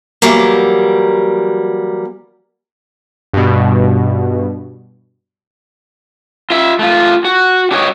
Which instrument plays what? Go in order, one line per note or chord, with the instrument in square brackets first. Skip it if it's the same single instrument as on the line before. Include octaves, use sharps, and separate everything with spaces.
[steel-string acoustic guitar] E3 F#3 G3 A#3
[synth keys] G2 B2
[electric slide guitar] F4 E5
A3 F4
F#4
D4 F#4 G4 A#4 C#5 D#5